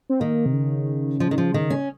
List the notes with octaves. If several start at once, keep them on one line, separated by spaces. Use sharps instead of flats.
C4
D#3 A#3
C3
C#3
F3
D#3
F3
D#3
C#4